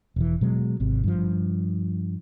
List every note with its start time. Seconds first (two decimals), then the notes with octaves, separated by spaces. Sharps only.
0.16 E1 E3
0.41 B2 F#3 G#3
0.80 G#1 C3
1.04 G2 F3